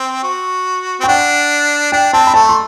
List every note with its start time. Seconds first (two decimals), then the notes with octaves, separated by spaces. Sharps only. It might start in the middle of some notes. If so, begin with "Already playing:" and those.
Already playing: C4
0.23 F#4
1.00 C4
1.03 G5
1.08 D4 F#5
1.92 D4 G5
2.13 C4 A5
2.27 B5
2.34 A3 A5
2.49 C6